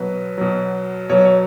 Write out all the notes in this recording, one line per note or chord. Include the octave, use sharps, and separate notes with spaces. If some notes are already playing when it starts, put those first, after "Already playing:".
Already playing: B2 F#3 B4
B2 F#3
B2 F#3 C#5
C#5